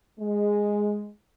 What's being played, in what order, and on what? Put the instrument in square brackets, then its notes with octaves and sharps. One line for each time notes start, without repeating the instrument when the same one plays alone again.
[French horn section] G#3